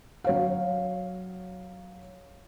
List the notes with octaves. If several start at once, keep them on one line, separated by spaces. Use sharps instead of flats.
F#3 C#5 F5